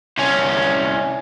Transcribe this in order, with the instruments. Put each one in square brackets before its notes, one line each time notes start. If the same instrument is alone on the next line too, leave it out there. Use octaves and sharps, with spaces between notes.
[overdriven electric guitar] C2 C#4